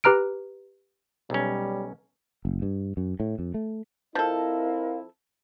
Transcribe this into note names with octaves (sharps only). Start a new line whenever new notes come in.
G4 B4 A#5 F6 D7
B1 G3 C#4
F#1
G2
F#2
A2
F2
A3
F3 C4 E4 A4 A#4 D#5 F5